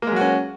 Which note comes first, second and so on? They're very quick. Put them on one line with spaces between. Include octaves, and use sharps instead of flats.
A#3 G#3 F#3 F#4 C#4